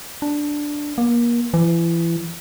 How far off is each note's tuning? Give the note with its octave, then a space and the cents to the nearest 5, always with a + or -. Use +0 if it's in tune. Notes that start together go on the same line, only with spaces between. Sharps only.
D4 +0
A#3 +30
E3 +30